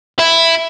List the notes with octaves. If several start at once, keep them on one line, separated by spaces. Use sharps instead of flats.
E4